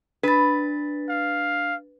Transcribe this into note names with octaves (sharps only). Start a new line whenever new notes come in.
D4 B4 A6
F5